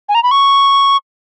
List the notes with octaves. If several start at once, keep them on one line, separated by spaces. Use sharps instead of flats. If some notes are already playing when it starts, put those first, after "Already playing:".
G#5
A#5
B5
C#6